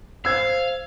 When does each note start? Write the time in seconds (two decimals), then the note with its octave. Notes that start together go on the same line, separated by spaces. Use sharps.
0.25 C5 F5 E6 G#6